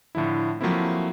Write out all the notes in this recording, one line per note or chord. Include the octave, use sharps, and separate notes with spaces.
A2 D3 F3 E4
F3 F#3 A3 A#3 C4 E4